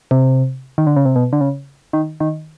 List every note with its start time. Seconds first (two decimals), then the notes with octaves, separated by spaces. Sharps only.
0.11 C3
0.78 D#3
0.87 D3
0.96 C#3
1.05 C3
1.16 B2
1.33 D3
1.41 C#3
1.93 D#3
2.20 D#3